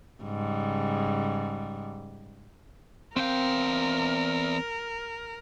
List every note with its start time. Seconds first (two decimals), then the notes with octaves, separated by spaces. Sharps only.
0.24 G#2 C#3 G3
3.16 E2 C4 A#4 F5 G5